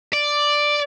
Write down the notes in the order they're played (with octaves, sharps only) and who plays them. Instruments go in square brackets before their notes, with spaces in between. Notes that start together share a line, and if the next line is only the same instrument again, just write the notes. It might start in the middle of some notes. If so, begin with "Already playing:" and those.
[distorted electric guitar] D5